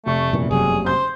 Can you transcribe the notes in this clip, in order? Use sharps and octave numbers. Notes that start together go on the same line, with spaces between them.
F1 A3 C#6
F#2 A#2 E3
F#1 C3 F#3 G#4
C5 G6